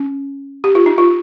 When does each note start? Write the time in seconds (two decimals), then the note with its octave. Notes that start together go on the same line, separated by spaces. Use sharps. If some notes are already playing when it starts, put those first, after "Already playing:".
Already playing: C#4
0.64 G4
0.75 F4
0.86 D#4
0.98 F4